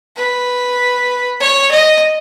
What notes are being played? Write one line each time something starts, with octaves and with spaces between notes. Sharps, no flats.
B4
C#5
D#5